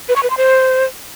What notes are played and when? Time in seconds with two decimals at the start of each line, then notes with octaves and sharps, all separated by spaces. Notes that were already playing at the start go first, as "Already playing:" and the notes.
0.09 B4
0.16 C#6
0.23 B4
0.30 C6
0.37 C5